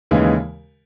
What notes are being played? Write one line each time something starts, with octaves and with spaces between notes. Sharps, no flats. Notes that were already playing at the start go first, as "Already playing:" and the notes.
D#2 C#3 E3 G#3